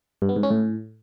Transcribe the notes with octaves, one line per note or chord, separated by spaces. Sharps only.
G2
B3
G#2
C#4
A2